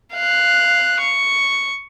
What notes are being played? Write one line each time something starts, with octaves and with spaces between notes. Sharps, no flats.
F5 F#6
C#6